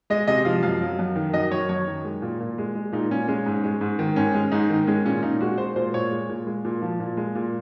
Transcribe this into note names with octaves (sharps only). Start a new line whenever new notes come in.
G#3 D#5
C3 D#5
F3 F5
F#2 F5
F#3
F#2
D#3
F#2 D#5
F#3 C#5
F#2 C#5
D#3
G#3
A#2
A#2
G#3
G#3
A#2 D#4
A#2 C#4
G#3 C#4
G#2
G#3
G#2
D#3
G#2 C#4
G#3
G#2 D#4
D#3
G#3 C#4
A#2 C#4
A#2 D#4
G#3 F#4
G#3 C5
A#2 C5
A#2 C#5
G#3
A#2
G#3
A#2
F3
A#2
G#3
A#2